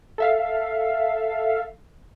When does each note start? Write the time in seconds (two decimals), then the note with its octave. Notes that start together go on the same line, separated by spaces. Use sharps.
0.18 A4 E5 F5